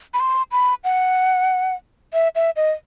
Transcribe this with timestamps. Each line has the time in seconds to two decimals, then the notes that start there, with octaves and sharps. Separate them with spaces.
0.14 B5
0.20 C6
0.52 B5
0.84 F#5
2.13 E5
2.35 E5
2.56 D#5